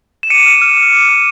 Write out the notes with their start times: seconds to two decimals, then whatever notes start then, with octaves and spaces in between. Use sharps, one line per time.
0.23 E7
0.30 D6 C#7 D#7
0.46 F6
0.62 F6
0.78 D6
0.92 D6
1.09 F6